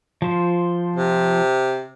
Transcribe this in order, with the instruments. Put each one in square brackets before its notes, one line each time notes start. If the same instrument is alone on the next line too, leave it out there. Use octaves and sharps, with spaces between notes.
[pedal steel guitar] F3 C5
[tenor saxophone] C3